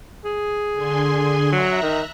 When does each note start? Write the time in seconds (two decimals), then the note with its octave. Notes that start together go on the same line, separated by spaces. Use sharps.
0.25 G#4
0.74 D3 G#5 C6
1.52 F#3 E5 A#5 F#6
1.83 D#3